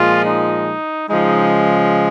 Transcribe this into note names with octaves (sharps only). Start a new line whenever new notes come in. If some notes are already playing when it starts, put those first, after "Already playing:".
Already playing: A#2 F3 G#3 F4
D#4
C#3 F3 G#3 D#4